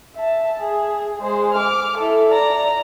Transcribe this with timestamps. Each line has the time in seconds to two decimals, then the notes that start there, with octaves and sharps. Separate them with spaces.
0.16 E5 A5
0.60 G#4
1.22 G#3 C5
1.54 D6 F6
1.98 E4 A4
2.30 D5 A#5